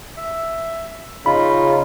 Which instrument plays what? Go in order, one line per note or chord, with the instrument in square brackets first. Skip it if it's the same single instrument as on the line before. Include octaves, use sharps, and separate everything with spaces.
[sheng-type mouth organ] E5
[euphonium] C#3 [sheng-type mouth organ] D#4 F4 [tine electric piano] B5